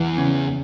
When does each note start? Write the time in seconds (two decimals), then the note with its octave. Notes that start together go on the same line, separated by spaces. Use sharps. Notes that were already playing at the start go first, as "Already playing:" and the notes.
Already playing: E2 E3
0.18 C#3